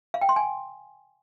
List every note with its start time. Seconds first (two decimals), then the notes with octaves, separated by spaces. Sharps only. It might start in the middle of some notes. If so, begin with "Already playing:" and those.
0.14 F5
0.21 G5
0.29 C6
0.36 G#5